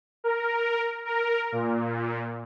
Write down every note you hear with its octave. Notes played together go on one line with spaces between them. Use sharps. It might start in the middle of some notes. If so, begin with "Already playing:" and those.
A#4
A#4
A#2